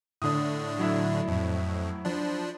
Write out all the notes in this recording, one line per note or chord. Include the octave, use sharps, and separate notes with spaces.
A2 D3 D4 D#6
F#3 E4 E5
F2 A2
F3 D4